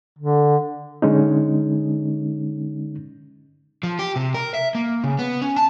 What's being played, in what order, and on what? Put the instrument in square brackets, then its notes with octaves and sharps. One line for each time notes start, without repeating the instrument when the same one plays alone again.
[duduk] D3
[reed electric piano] D3 G#3 C#4 D#4
[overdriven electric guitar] F3
G4
C3
A#4
E5
A#3
C#3
B3
C#4
A5